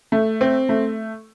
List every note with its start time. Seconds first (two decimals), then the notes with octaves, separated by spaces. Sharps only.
0.12 A3
0.41 C4
0.69 A3